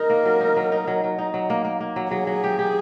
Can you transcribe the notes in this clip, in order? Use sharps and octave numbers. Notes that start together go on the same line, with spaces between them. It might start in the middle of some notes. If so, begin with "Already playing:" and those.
Already playing: D#4 A#4
A#3
F#3
D#4
F#3
D#4
F#3
F#3
D#4
F#3
A#3
A#3
A#3
F#3
F#3 G#4
F#3
G4
G4